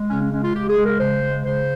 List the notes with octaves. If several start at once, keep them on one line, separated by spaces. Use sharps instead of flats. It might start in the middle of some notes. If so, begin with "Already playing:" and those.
Already playing: G#3
C#3 C#4
C#4
G#3 C#4
F4
C#3 G4
G#4
G#3
A#4
C#3 C5
G#3
C#3 C5